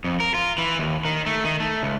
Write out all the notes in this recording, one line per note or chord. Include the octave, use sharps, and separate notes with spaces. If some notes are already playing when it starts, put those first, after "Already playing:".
F2
A#4
F4
E3
D#2
D#3
A3
D#3
A3
C#2